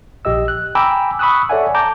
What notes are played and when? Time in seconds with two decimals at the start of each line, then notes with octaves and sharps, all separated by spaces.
0.25 A#1 G4 D#5 E6
0.48 F#6
0.75 G5 G#5 A#5 B5 D6 E6
1.19 B5 C#6 D#6 E6 F#6
1.49 A4 C#5 D5 E5 F#5 G#5
1.75 A5 A#5 D6 G6